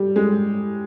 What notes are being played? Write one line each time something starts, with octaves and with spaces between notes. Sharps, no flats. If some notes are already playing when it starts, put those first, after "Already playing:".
Already playing: G3
G#3